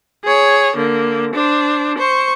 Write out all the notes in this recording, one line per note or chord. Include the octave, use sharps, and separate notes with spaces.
G#4 C#5
D3 A#3
D4 C5
C5 C#6